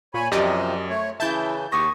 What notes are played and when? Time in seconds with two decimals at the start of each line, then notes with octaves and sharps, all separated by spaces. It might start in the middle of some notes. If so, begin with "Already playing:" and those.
0.14 A#2 C#5 G#5 B5
0.32 F#2 C3 F3 G4 D5 D#5
0.90 A3 C#5
1.20 C#3 E3 E4 E5 A5 G6
1.72 D#2 G4 C#6 D#6 A#6